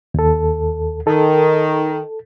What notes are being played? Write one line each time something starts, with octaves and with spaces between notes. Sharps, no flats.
D#2 A4
D#3 A4